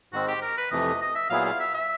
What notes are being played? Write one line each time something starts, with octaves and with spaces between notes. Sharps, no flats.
G#2 D#3 G#3 C4 F#4
G4
A#4
B4
F2 C3 E3 A3 D#5
D#5
E5
A#2 F#3 B3 E4 G#4 F5
F5
E5
E5